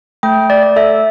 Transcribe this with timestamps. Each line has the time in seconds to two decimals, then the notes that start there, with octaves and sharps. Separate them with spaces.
0.23 A3 G5
0.50 A3 D5
0.63 D5
0.76 A4 E5